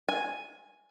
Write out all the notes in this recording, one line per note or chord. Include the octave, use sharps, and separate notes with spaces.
G#5